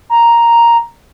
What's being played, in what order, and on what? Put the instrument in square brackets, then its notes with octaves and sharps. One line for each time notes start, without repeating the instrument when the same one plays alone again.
[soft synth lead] A#5